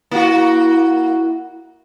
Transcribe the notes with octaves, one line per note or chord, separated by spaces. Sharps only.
A#3 E4 F#4